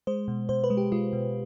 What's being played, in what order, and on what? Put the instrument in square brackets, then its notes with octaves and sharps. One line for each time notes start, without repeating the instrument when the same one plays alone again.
[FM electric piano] G#3 C5
B2
B2 C5
B4
G#3
G4
G#3 F4
B2